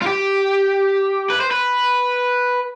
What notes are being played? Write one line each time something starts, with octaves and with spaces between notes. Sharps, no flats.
F4
G4
B4
C5
B4